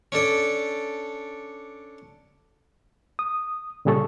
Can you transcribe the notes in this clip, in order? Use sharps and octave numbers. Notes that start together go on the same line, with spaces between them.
C#4 D4 A4 D5
D#6
A#2 C#3 G3 G#4 A4 C#6